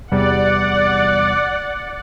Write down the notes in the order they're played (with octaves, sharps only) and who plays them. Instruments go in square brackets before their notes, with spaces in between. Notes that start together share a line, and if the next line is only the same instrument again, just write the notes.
[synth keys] E2 C3 G3 [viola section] D5 F#5